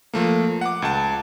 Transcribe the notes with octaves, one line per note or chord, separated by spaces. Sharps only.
F3 A3 A#3
F#5 D6
C#2 A5